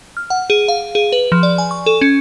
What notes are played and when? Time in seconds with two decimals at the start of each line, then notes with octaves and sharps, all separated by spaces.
0.17 F6
0.30 F#5
0.50 G#4
0.68 F5
0.95 G#4
1.12 B4
1.32 F3
1.43 D5
1.58 G#5
1.71 C#6
1.86 A4
2.01 C#4